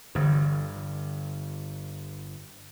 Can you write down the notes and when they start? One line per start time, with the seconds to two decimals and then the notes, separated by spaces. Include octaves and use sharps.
0.15 G1 G2 D3 E3